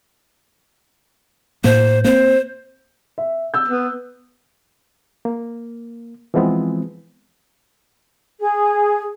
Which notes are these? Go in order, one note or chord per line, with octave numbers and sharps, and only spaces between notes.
A2 A#3 C5
A#3 C4 C5
E5
E6 G6
B3
A#3
E3 F3 G#3 B3 C4
G#4